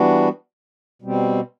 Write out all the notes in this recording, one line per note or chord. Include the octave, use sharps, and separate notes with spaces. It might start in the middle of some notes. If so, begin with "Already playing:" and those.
Already playing: E3 G3 B3 D4 F#4
B2 G3 C4